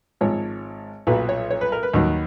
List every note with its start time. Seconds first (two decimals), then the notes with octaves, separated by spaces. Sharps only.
0.21 G#1 G#2 F3 C#5
1.07 B1 A#2 F#3 B4
1.29 C#5
1.51 C#5
1.61 B4
1.72 A#4
1.83 B4
1.94 D#2 D#3 F#3